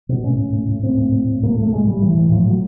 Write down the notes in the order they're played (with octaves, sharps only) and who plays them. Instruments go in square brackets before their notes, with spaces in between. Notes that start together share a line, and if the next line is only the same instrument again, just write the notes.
[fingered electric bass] B2
A2 C#4
A2
A2
A2
A2 C4
A2
A2
A2
A2 A#3
A3
A2
A3
A2 G#3
A2 G3
A2 E3
A2
A2 F3
A2 F#3